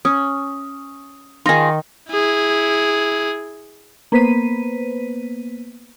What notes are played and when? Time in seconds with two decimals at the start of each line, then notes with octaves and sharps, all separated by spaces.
0.05 C#4 D#6
1.46 D#3 D#4 F4 G#4 C6 A#6
2.10 E4 G#4
4.12 A#3 B3 B4 C5 B6 D#7